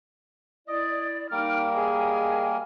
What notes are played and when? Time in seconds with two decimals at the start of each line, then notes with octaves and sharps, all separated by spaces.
0.68 E4 D5 D#5
1.32 G3 A#3 D#4 A#4 D6 F6
1.74 G#4 D#5 G#5